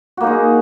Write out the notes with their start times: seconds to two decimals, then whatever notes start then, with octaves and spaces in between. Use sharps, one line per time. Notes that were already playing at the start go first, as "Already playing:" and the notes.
0.17 F#4
0.21 A#3
0.24 D#4
0.27 G#3